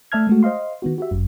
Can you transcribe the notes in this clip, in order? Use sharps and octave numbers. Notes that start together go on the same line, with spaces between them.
A3 D5 E5 A5 F6 G#6
G#3 A3 F#4
C5 D#5 F5 C6
D#3 B3 F#4
F#4 G4 E5
G1 F#2